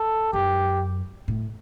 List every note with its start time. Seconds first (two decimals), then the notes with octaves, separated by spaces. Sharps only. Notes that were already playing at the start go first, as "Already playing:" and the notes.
Already playing: A4
0.33 F#2 G4
1.28 A2